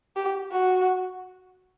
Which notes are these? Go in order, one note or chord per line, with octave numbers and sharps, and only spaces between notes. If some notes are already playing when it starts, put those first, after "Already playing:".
G4
F#4